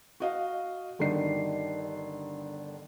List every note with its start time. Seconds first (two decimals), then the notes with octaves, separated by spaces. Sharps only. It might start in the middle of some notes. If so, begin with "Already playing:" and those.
0.20 F#4 D#5 F5
0.99 G1 D3 D#3 G3 D4 C7